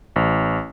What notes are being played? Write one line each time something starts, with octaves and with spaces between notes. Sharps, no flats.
A1